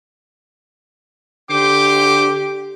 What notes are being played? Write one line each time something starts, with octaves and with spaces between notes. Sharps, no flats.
D3 G4 C5 C6 D6